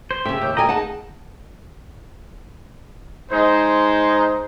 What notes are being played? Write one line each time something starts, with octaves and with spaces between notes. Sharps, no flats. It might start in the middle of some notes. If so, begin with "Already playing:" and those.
C5
A2 C#3 G4 E5
D#2 G6
D2 D#5 G5 G#5 A#5
D#4 G#4 F#5 A5
G#3 D#4 C5